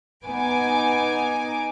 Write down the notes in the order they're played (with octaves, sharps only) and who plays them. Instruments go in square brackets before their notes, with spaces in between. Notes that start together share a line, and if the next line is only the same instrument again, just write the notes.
[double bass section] B3 [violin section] D#4 G#5 D6